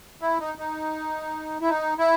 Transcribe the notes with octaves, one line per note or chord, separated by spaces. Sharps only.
E4
D#4
D#4
E4
D#4
E4